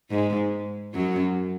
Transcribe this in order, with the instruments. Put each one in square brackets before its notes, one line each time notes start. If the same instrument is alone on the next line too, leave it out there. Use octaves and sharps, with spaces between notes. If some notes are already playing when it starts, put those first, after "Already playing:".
[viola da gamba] G#2 G#3
F#2 F#3